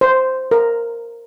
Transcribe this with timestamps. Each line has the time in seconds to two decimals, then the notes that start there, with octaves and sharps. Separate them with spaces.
0.01 C5
0.51 A#4